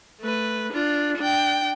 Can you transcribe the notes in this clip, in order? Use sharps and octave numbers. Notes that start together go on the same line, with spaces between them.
A3 B4
D4 F4
D4 G5